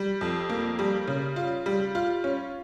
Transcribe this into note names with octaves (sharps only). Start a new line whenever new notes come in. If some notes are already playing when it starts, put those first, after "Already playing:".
Already playing: G3
F2
A#3
G3
C#3
F4
G3
F4
C#4